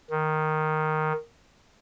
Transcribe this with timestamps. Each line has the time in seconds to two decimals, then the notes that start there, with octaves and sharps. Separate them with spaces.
0.10 D#3